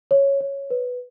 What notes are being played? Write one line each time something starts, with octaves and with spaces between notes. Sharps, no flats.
C#5
C#5
B4